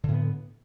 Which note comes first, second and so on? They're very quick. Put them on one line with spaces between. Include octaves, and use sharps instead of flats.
D3 A2 B3